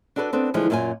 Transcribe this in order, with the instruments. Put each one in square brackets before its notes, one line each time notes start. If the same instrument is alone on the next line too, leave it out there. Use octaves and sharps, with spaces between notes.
[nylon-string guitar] D4 F#4 A4 B4 C5 D5
B3 C4 D4 A4
D3 E3 F3 G#3 A3
F#2 A#2 F4 A#4 G#5